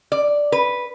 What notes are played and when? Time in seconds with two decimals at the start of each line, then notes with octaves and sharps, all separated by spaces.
0.12 D5
0.52 B4